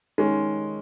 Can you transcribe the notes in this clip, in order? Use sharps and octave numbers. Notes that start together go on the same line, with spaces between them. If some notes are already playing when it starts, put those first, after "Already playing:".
D#3 G#3 C#4